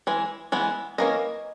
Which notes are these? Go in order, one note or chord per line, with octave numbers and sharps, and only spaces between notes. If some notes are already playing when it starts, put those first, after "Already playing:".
E3 G#3
E3 G#3 B3
E3 A#3 C#4 D#5